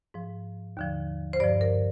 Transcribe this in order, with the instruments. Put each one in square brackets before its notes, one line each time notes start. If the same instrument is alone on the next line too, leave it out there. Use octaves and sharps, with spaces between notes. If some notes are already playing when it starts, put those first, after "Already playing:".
[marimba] G#2 F3
D#2 D3 F3
C5
G2 F3 D5
A#4